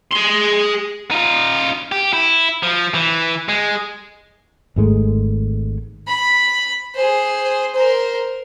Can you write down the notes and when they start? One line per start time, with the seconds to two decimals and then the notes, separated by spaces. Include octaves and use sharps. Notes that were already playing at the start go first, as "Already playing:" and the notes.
0.13 G#4 C6
1.11 D#4 F4
1.92 G4
2.13 E4
2.63 F3
2.94 E3
3.49 G#3
4.76 G#1 G#2 G#3 A3
6.08 B5
6.95 G#4 C5
7.74 A#4 C5